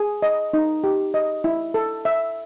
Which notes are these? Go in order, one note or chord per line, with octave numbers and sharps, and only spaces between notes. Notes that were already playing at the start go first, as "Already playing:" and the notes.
Already playing: G#4
D#5
D#4
G4
D#5
E4
A4
E5